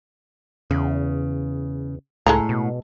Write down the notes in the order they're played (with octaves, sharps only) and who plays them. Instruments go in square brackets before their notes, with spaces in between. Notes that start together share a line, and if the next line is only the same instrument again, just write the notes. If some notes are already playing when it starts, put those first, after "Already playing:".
[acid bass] E2 [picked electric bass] C#3
[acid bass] C#2 [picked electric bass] A2 [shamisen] G#3 A4 A#5
[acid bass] B2